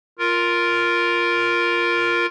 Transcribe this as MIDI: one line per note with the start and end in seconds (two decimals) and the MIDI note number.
0.19 2.26 65
0.19 2.26 70